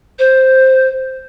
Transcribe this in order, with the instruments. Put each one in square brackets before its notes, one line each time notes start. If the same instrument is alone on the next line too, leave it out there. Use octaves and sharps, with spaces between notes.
[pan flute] C5